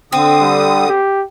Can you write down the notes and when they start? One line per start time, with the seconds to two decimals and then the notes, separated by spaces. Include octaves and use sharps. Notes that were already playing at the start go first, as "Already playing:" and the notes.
0.12 D3 C4 D#6
0.41 G3
0.89 G4